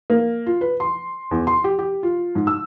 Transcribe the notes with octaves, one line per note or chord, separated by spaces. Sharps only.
A#3
F4
B4
C6
E2
C6
G4
G4
F4
G#2
E6